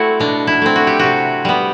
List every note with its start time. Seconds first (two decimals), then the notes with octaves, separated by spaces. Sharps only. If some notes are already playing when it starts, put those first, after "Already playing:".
Already playing: A3 C4 E4 F#4
0.20 B2 D4
0.47 E4
0.62 A3 C4
0.76 F#4
0.87 G4
0.99 C3 F#4
1.45 G3 B3